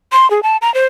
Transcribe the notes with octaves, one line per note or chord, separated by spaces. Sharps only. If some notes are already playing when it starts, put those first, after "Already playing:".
C6
G#4
A5
A#5
C5